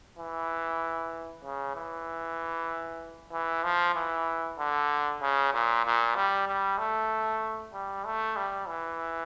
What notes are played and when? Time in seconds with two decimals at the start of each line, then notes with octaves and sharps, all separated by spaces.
0.19 E3
1.44 C#3
1.76 E3
3.33 E3
3.64 F3
3.96 E3
4.59 D3
5.22 C#3
5.54 A#2
5.85 A#2
6.16 G3
6.48 G3
6.78 A3
7.74 G3
8.05 A3
8.36 G3
8.68 E3